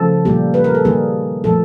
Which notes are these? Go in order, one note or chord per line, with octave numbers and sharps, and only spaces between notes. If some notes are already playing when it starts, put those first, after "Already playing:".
Already playing: C#3 F3 A3 A4
A#2 G3 A#3 G4
B4
A#4
A4
D#3 G3 A#3 G#4
A#2 F3 A3 A4